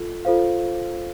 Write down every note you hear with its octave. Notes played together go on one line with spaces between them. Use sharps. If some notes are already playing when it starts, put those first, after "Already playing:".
Already playing: F4 A4
F4 A4 C5 F5